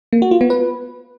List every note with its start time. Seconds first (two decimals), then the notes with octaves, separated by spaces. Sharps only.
0.13 A#3
0.22 F#4
0.31 F4
0.41 B3
0.50 B4